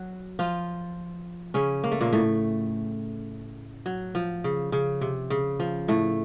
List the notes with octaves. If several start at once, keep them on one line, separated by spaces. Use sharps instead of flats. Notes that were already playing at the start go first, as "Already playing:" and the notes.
Already playing: F#3 F#4
F3 F4
C#3 C#4
A#3
A3
A#2 A#3
A2 A3
F#3
F3
C#3
C#3
C3
C#3
F3
A2 A3